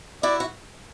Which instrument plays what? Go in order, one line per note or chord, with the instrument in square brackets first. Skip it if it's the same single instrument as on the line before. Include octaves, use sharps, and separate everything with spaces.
[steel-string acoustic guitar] E4 F#4 [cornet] D5
[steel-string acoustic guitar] F#4